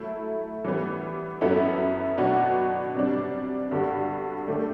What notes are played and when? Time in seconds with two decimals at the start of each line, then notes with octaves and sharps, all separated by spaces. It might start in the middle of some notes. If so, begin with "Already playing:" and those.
Already playing: F#3 A3 E4
0.64 E3 G3 B3
1.41 F#2 F#3 B3 E4 A4
2.18 B2 F#3 B3 D4 F#4
2.95 C3 G3 D4
3.71 G2 D3 G3 B3 F#4
4.48 D3 A3 D4 G4